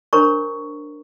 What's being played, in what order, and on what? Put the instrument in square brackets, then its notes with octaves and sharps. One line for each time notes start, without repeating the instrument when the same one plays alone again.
[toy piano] D4 A#4 C5 C#5 A#5 C#6